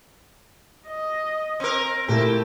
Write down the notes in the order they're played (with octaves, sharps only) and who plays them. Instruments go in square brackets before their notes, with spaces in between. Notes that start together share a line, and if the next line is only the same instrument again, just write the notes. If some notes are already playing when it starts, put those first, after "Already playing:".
[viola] D#5
[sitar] C4 A#4
[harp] A#2 [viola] A3 E4 [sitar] G4